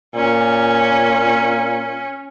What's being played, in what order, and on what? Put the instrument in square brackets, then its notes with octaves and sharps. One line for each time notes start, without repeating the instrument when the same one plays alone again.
[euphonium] A#2 [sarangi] C#4